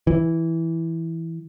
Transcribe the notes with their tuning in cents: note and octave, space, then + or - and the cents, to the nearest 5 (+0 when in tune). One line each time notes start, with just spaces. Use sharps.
E3 -5